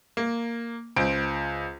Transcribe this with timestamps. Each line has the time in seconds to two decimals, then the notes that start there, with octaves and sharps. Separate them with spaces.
0.17 A#3
0.96 C#2 C5 D7